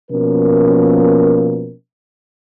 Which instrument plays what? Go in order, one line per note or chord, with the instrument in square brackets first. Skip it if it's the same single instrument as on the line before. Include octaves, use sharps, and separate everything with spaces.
[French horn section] B2 F3 A#3 C#4 A#4